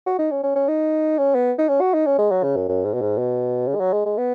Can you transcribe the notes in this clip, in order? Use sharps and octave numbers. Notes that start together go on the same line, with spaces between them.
F#4
D#4
C#4
C#4
C#4
D#4
C#4
B3
D#4
C#4
F#4
D#4
C#4
G#3
F#3
C#3
F#2
F#2
G#2
B2
G#2
B2
C#3
G#3
F#3
G#3
G#3
B3